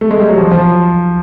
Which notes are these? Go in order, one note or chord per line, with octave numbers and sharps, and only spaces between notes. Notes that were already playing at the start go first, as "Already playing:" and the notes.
A3
G#3
G3
F#3
F3
F3